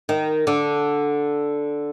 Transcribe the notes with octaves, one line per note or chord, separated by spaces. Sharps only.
D#3
D3